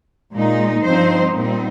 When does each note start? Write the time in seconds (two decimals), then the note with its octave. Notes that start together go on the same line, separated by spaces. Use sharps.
0.33 A#2 G#3 D#4
0.83 G2 F3 C4 D#4 C5
1.33 A#2 G3 C4 D#4